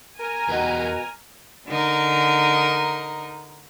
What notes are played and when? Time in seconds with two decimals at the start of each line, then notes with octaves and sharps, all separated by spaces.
0.19 A#4 G#5 A#5
0.48 E2 B2 B3 G4
1.67 D3 D#4 A#4